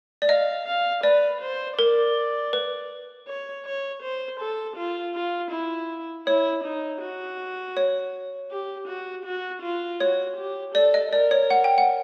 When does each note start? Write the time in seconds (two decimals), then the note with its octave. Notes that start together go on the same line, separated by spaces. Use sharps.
0.22 D5
0.28 D#5 F5
0.67 F5
1.03 B4 D5
1.42 C5
1.78 A#4 D5
2.53 B4
3.28 C#5
3.66 C#5
4.03 C5
4.40 A4
4.77 F4
5.15 F4
5.51 E4
6.27 E4 C#5
6.64 D#4
7.02 F#4
7.77 C#5
8.51 G4
8.88 F#4
9.25 F#4
9.63 F4
10.00 F#4 C#5
10.37 G4
10.75 A4 D5
10.94 D#5
11.12 A#4 D5
11.31 C#5
11.50 F#5
11.64 G5
11.78 F#5